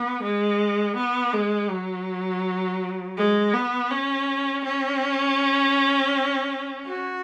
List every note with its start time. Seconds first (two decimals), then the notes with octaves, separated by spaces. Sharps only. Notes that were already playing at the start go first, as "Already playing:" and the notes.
Already playing: B3
0.23 G#3
0.97 B3
1.33 G#3
1.70 F#3
3.18 G#3
3.54 B3
3.91 C#4
4.65 C#4
6.86 F#4